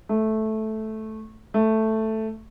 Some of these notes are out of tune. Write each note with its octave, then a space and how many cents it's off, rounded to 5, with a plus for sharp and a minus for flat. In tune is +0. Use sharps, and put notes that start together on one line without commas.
A3 -10
A3 +0